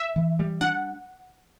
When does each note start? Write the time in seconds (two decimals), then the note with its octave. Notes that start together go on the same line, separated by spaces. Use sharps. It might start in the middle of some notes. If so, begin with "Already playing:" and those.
Already playing: E5
0.16 E3
0.39 G3
0.61 D4 F#5